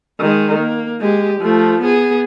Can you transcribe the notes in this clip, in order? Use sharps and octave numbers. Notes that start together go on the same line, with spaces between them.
D#3 G#3
A#3
G#3 G4
F3 A3
B3 G#4